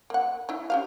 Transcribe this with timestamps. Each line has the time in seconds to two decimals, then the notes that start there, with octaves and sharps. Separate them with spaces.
0.10 A#3 F#5
0.49 D#4 E4
0.70 C#4 G4 F5